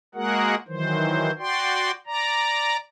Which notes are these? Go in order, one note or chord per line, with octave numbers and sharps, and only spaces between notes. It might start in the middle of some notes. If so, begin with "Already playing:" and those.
G#3 A#3 F#4 G#4 A#4 F#5
D#3 E3 F#3 C5
F#4 D5 G5 C6
D5 A#5